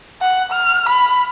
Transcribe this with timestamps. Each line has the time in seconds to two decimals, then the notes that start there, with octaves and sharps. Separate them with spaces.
0.22 F#5
0.52 F6
0.89 B5